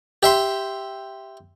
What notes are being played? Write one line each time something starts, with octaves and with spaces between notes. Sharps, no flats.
G4 E5 C6